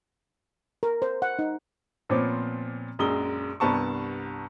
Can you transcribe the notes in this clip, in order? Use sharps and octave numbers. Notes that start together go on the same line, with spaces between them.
A#4
C5
F#5
D#4
A#2 F3 B3 C4 C#5 D6
A#1 F#2 G#3 D#6 G7
C2 G2 B3 A5 C#6